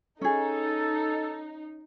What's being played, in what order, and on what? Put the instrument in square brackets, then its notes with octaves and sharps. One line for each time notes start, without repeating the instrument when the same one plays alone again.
[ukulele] C#4 G#4 [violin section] D#4 [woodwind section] A4